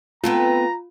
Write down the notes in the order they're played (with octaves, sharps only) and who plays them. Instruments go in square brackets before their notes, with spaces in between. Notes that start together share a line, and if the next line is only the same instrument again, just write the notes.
[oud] B3 C4 A4 [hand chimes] F4 [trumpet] A#5